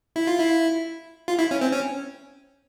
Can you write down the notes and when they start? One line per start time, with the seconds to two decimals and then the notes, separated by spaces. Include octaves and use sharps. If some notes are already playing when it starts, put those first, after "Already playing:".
0.16 E4
0.27 F4
0.40 E4
1.28 F4
1.39 E4
1.51 C#4
1.61 C4
1.73 C#4